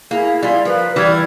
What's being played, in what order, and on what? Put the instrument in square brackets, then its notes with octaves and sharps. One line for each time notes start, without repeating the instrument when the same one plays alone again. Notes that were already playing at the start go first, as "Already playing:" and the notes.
[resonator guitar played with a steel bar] A#3 [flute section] E4 G#4
[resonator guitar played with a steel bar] G3 F4
[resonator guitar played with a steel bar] F3 [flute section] A#4 B4
[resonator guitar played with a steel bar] E3 G3 [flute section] F6 G#6